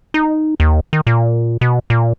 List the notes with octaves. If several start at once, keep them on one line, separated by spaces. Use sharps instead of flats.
D#4
D#2
D#3
A#2
B2
A#2